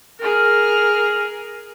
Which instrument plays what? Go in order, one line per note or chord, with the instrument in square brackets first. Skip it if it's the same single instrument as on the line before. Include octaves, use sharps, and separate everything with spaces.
[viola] G#4 A#4 [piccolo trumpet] F6